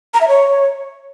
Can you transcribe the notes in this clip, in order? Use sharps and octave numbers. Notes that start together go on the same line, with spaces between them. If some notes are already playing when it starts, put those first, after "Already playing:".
A#5
E5
C#5